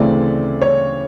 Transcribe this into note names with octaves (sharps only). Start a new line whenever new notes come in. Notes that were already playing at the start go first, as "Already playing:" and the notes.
Already playing: D2 C#3 E3 A3 C4 D5
C#5